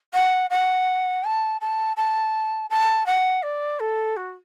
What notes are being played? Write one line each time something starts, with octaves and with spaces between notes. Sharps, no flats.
F#5
F#5
A5
A5
A5
A5
F#5
D5
A4
F#4